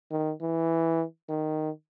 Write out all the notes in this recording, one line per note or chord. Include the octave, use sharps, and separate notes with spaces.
D#3
E3
D#3